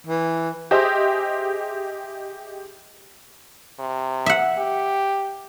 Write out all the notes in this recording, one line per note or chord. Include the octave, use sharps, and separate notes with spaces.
E3
G4 G#4 C5 D#5 E5
C3
E5 F#5
G4